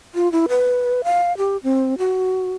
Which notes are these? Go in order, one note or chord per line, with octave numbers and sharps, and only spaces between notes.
F4
E4
B4
F5
G4
C4
F#4